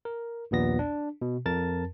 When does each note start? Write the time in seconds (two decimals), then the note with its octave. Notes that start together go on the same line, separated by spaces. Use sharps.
0.05 A#4
0.51 A#1 D#2 A#2 B3 A#6
0.79 D4
1.22 B2
1.46 F2 A#4 A5 A6